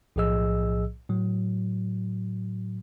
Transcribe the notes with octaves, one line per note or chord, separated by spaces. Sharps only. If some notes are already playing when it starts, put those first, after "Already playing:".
B1 A2 F3 G#4 D#5 E6
A2 F#3